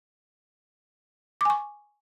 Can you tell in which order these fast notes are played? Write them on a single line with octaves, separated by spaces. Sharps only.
D6 G#5 C#6